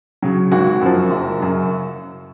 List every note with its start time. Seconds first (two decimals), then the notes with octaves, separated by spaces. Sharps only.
0.22 C#3 F#3
0.52 G#1 F#4
0.81 F#2 F3
1.10 F#1
1.40 F#2 C#3